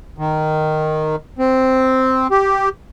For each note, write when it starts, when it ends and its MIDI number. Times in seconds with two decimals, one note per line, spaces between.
0.18 1.16 51
1.39 2.27 60
2.31 2.69 67